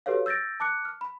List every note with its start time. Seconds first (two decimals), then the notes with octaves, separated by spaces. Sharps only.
0.06 F#4 G4 A4 B4 C#5 F5
0.26 E6 G6 A6 A#6 D7
0.60 A5 D6 F#6 C#7
0.85 F6
1.01 B5